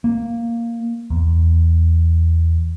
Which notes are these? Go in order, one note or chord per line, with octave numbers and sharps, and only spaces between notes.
A#3
E2